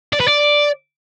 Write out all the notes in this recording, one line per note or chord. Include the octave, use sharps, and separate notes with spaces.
D5
B4
D5